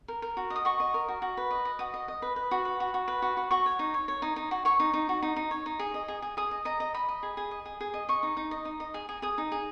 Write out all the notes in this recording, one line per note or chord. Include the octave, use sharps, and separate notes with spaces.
A#4
A#4
F#4
D#5
D#6
F#4 C#6
D#5
A#4
F#4
F#4
B4
D#5
D#5
F#4 D#6
D#5
D#5
B4
B4
F#4
B4
F#4
F#4
B4
F#4
F#4
F#4 C#6
C#5
D#4
C#5
C#5
D#4
D#4
F#4
C#5 C#6
D#4
D#4
F#4
D#4
D#4
C#5
D#4
G#4
D#5
G#4
G#4
G#4 D#6
D#5
D#5 A#5
D#5
D#5 B5
D#5
G#4
G#4
D#5
G#4
G#4
D#5
D#5 C#6
D#4
D#4
D#5
D#4
D#5
G#4
G#4
G#4 D#6
D#4
G#4